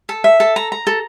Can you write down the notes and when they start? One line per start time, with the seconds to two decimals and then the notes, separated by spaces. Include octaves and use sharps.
0.09 A4
0.24 E5
0.40 A4
0.56 A#5
0.72 A#5
0.87 A4